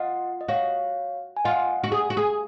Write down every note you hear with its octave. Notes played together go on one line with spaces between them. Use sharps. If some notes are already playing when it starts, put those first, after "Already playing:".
Already playing: F4 D#5 F#5
D#5
F#4 C#5 F5
G#5
F4 D#5 F#5
F#4
G#4
F#4
G#4